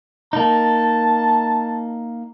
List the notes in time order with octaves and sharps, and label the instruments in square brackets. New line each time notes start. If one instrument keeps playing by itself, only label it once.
[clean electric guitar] A#3 D#4 [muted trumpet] A5